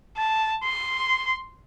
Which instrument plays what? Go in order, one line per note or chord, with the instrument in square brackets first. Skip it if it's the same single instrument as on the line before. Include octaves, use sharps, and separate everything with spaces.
[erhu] A5
C6